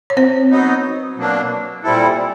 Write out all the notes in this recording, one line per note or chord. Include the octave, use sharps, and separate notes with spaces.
C#5
C4 C5
F#3 B3 D#4
B2 F#3 A#3 D4
A#2 G3 C4 E4 A4